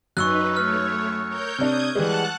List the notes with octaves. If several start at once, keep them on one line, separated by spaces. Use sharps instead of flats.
F#2 D#4 B4 C#6 E6 F#6
A3 C#5 F6
A#4 C#5 G6
C3 D4 D#6 G6 G#6
E3 G3 G#3 F#5 A5 F#6